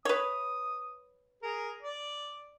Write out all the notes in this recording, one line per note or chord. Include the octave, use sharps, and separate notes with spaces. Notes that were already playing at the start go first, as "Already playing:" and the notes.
B4 C#5 D#6
G#4 A#4
D5